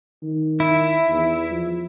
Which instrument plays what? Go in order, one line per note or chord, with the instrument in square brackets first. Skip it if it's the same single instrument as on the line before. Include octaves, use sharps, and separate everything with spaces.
[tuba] D#3
[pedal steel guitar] E4
[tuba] E2
F3